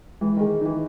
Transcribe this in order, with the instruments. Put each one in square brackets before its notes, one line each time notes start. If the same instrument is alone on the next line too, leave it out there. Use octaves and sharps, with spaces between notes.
[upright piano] E3 [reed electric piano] G#3
[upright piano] D#3 [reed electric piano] G#4
[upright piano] E3 [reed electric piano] D#4